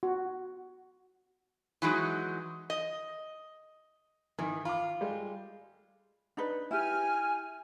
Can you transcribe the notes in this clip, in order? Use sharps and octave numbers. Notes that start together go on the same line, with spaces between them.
F#4
E3 F#3 G#3 D#4
D#5
D#3 E3
F4 B5 D6
G3 G#3
D4 D#4 B4
E4 G4 G#5 F6